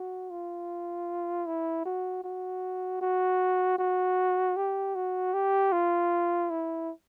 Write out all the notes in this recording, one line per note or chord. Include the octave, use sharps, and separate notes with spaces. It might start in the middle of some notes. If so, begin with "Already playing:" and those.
Already playing: F#4
F4
E4
F#4
F#4
F#4
F#4
G4
F#4
G4
F4
E4